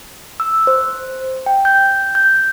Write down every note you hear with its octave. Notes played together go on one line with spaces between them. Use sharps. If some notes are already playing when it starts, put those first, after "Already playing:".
E6
C5
G5
G6
G6